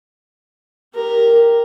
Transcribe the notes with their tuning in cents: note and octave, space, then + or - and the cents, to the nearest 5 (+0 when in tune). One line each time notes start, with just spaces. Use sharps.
G4 +0 A#4 +0